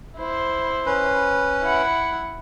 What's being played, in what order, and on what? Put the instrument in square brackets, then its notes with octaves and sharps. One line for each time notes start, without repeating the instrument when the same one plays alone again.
[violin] E4 C5
[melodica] C#4 B4
[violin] E4 F#5